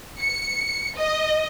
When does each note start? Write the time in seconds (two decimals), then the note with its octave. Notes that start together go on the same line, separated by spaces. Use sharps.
0.19 C#7
0.97 D#5